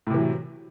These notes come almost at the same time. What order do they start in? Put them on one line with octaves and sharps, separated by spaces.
A2 C3 E3 F#3